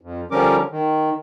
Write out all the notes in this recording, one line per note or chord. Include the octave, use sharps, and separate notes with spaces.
F2
D3 F3 G3 C#4 A#4 D6
D#3